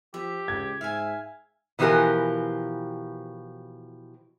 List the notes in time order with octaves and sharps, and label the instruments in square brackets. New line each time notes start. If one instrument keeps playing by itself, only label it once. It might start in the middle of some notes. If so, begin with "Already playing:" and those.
[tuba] F3 [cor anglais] G4 [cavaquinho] E5
[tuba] C#2 [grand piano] G#6
[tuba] G#2 [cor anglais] E5 [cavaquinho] F5 G#5
[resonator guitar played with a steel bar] B2 E3 F3 G4 A#4 G#5